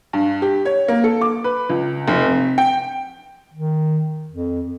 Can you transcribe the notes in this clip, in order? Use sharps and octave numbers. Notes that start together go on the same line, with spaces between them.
G2
G4
C#5
A#3
A4
D6
B4
C#2
F1
C3
G5
D#3
F2